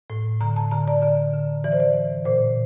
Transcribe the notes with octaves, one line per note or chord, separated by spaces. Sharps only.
A2
D3 A#5
A5
D3 A#5
D5
D3 D5
D3
E3 D5
C5
D5
E3
A#2 C5